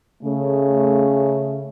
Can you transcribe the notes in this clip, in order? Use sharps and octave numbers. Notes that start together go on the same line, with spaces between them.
C#3 A3